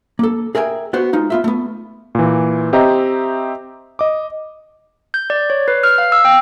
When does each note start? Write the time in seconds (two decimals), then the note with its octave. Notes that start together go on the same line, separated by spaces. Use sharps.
0.19 A#3 A4
0.55 G#4 A#4 E5 G5 G#5
0.93 B3 F#4 C5
1.13 G#3 D#4 F4
1.30 B3 F4 E5
1.44 A3 B3
2.15 A#2 E3
2.73 C4 G4 D#5 E5 A#5
3.99 D#5 D6
5.14 G6
5.30 D5
5.50 C#5
5.68 B4
5.83 F6
5.98 F5
6.12 E6
6.25 G5